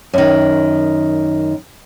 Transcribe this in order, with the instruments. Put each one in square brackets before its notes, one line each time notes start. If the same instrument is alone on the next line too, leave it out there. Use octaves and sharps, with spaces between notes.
[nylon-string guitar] F#2 D#3